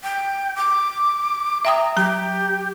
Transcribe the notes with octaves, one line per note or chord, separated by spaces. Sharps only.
G5
D6
E5 G5 A#5 D#6
F#3 G4 A#5